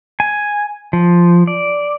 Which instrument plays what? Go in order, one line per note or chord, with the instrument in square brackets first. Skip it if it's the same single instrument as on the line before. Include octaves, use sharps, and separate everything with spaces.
[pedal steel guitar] G#5
F3
D5